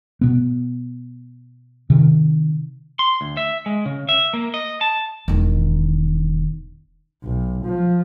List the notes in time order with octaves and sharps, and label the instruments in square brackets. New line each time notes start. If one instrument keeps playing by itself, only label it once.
[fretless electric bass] B2 B3
C3 D#3
[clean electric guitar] C6
D2
E5
G#3
C#3
E5
A#3
D#5
A5
[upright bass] E1 D#3
[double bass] B1
F3